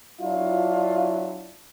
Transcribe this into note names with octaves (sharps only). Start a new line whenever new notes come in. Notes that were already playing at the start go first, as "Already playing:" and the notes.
F#3 D4 E4 F4